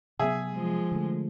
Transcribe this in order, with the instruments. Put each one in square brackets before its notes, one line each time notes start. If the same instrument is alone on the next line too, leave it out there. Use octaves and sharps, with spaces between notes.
[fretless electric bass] C3 F#3 B3 [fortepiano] G#4 E5
[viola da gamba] F3 G#3
[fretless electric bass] D3 A3